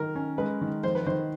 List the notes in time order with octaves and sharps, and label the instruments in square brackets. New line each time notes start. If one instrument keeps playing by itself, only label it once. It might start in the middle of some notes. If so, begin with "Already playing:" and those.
Already playing: [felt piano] D#3 [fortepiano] A#4
[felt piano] C#4
[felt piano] G#3 [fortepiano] B4
[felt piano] D#3
[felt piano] F2 [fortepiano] C5
[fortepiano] B4
[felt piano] D#3 [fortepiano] C5